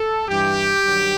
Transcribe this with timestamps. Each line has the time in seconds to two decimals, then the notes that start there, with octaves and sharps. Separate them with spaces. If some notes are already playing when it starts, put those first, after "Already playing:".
Already playing: A4
0.28 G2 E3 G4
0.83 G2 D#3 F#3